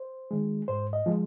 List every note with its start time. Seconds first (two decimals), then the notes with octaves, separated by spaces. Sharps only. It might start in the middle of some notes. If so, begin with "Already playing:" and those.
Already playing: C5
0.31 D#3 G#3
0.68 G#2 C5
0.93 D#5
1.06 F3 G#3